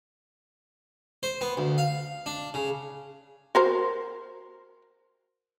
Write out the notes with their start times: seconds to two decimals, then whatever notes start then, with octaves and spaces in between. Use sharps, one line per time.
1.23 C5
1.41 B3
1.57 D2
1.78 F5
2.26 D4
2.54 C#3
3.55 F#4 A#4 C5